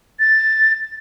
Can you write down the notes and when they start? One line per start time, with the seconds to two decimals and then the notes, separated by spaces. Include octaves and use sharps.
0.20 A6